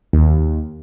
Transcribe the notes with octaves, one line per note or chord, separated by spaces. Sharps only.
D#2